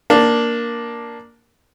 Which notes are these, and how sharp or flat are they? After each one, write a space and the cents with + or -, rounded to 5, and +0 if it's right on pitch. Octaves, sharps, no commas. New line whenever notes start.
A#3 +5 D4 +0